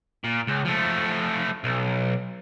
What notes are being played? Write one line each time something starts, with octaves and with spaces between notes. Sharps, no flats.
A#2
C#2
F3 A3
B1